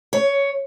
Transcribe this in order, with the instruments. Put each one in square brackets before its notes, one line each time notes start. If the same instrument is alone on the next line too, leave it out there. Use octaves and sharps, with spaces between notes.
[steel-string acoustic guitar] C#5